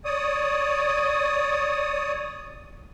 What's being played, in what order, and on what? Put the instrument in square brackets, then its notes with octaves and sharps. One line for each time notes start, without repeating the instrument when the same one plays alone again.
[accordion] C#5 D5 D#6